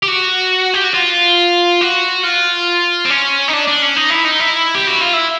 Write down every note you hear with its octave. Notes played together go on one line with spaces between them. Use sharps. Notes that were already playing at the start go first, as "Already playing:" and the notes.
G4
F#4
G4
F#4
F4
F#4
F4
C4
C#4
D#4
D4
D4
C#4
D#4
E4
D#4
E4
G4
F#4
F4
E4